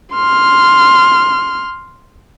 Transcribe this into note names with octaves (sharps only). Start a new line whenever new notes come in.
C6 F6